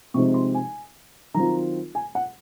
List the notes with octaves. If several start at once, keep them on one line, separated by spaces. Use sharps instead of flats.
C3 F3 G#3 C4 D#4 C#6
C6
G#5
D#3 F#3 C4 F4 A#5
G#5
F#5